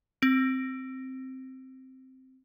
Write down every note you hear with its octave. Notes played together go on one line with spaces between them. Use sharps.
C4 D7